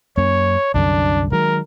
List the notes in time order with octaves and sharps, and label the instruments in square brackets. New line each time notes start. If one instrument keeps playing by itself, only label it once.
[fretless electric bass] F#2 A#3 C#4 [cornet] C#5
[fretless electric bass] C2 F#2 D3 [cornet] D4
[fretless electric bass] D#3 F#3 G#3 [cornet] A#4